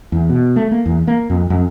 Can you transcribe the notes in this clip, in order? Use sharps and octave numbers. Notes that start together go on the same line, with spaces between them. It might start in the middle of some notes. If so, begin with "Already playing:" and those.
E2
B2
A3
A#3
E2
A#3
F2
F2